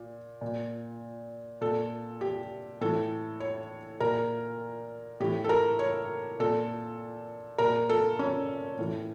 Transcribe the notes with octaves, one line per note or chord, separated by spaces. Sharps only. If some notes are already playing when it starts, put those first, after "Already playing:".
Already playing: A#2
A#2
A#2 A4
G4
A2 E3 A4
C#5
A#2 A#4
A2 E3 G4
A4
A#4
C#5
A#2 A4
A#2 A#4
A4
C#4
A2 E3